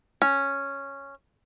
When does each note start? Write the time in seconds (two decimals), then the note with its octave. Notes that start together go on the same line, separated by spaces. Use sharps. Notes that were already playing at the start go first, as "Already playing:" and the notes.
0.22 C#4